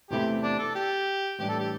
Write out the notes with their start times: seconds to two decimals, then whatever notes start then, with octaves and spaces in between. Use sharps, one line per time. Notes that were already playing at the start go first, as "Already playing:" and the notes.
0.10 E2 C3 E3 A3 E4 G4
0.43 D4
0.59 A4
0.75 G4
1.39 A2 E3 G3 D4 G4
1.49 A4
1.60 G4